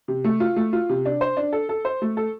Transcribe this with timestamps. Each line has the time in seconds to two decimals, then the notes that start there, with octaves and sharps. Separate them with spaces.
0.08 C3
0.24 A3
0.40 F4
0.56 A3
0.73 F4
0.89 C3
1.05 D4
1.21 C5
1.37 D4
1.53 A4
1.69 A4
1.85 C5
2.02 A3
2.17 A4